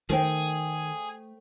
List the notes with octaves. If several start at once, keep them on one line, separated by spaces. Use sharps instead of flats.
D#3 A3 G#4 A4 C5 G5